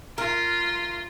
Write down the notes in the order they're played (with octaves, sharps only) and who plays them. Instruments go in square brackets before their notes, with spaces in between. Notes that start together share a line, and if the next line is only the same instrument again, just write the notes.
[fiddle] F4 [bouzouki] A#4